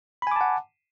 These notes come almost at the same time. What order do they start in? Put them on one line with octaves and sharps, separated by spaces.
B5 G#5 D6 A5 F#5